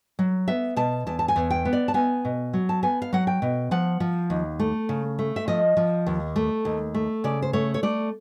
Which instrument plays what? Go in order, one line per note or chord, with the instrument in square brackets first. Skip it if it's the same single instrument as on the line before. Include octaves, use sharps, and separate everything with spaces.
[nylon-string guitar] F#3
B3 E5
B2 A5
E2 A5
A5
G#5
E2
G5
B3
D5
A5
B3 G#5
B2
F#3
A5
B3 G#5
F5
F#3 F#5
G5
B2
F3 F#5
F3
D#2
A3
C#3
A3
E5
F3 D#5
F3
D#2
A3
D#2
A3
C#3 D5
C5
A3 C#5
C#5
A3 D5